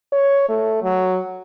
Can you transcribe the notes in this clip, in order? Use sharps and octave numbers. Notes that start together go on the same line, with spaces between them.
C#5
A3
F#3